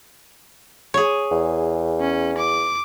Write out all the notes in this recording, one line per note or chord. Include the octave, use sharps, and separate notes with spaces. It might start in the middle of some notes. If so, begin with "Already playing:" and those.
G#4 C#5
E2
C#4
D6